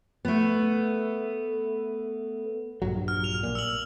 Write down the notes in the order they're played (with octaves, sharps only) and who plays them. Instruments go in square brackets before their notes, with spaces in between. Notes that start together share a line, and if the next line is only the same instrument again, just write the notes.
[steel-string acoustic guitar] A3 B3
[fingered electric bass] A#1 G2 F#3
[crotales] F6
F7
[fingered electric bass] A#2
[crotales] E6 F#7